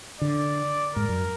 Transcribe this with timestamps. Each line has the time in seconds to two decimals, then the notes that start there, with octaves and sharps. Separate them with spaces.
0.21 D3 D5
0.96 G#2 A#4
1.09 F#2